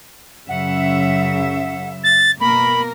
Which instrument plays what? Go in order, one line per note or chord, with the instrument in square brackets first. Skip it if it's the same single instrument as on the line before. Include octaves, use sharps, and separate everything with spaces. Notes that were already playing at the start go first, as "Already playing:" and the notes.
[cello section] F#2 C#3 E5 [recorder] F#5
[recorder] A6
[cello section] B2 A#3 A#4 [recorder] B5